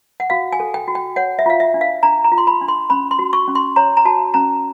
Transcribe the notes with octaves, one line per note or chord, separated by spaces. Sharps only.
F#5
F#4 F5
G#5
A4
G5
F#4
G5
C#5 F#5
E5
F4 F5
E5
D4
F5
D4 A#5
A#5
F4
C6
B5
D4
C6
C#4 B5
C6
F#4
C#6
C#4
C6
C#5 A#5
A#5
F#4 A5
C#4 A#5